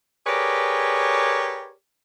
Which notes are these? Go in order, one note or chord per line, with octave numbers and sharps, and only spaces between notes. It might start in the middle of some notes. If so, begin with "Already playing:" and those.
G4 G#4 A#4 B4 C#5 D5